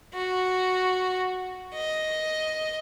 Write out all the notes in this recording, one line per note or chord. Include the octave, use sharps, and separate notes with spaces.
F#4
D#5